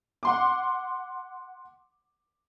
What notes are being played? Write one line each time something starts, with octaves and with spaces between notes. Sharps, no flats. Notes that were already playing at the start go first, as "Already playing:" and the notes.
F#5 C6 D6